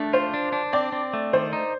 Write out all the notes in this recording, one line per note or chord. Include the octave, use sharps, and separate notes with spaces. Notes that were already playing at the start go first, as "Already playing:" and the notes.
Already playing: A3 D4
F4 C5
D4
D4
C4 D5
C4
A3
D#3 C5
D#4